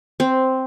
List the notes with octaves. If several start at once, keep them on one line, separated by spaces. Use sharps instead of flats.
C4